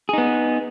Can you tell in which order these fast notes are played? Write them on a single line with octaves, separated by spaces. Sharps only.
G#4 D#4 B3